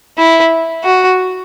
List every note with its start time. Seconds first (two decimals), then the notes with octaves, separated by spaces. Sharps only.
0.18 E4
0.84 F#4